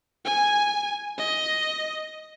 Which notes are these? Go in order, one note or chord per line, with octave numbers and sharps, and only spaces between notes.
G#5
D#5